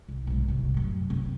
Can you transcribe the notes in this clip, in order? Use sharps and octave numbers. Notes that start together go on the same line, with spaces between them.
C2
B1 G#2
C2 C3
F#2 A2
C2 C4